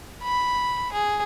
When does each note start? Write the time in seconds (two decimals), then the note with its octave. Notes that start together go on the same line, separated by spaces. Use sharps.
0.23 B5
0.92 G#4